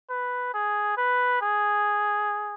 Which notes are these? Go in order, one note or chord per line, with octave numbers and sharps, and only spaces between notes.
B4
G#4
B4
G#4